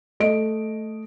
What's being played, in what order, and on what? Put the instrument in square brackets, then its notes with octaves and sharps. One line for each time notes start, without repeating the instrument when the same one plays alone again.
[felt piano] A3 D#5 D7